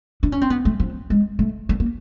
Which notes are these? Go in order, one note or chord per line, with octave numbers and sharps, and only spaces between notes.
D4
C#4
C4
B3
A3
F3
G#3
A3
A3
A#3